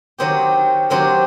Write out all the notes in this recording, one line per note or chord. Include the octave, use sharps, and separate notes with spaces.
D#3 F#3 C4 G4
D#3 F#3 C4 G4